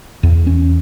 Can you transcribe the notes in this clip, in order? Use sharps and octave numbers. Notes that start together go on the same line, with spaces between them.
E2
C#4